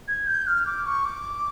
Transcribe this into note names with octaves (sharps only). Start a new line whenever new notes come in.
G#6
G6
F6
D6
C#6
D6